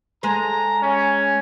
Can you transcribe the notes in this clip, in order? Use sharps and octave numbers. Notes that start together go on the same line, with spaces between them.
G#3 A4 C5 A#5
C#4